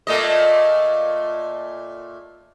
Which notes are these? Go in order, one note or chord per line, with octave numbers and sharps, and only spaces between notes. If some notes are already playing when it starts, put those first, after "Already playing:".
A#2 A3 D#5